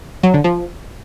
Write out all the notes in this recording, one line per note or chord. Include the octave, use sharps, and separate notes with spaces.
F#3
D3
F3